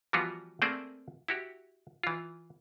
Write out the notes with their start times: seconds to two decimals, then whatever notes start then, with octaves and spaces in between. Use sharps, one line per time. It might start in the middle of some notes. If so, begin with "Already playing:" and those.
0.13 E3 F3 G3 B3 F4 F#4
0.62 A3 A#3 C4 G#4 C5 D5
1.28 E4 F#4 G4
2.03 E3 F4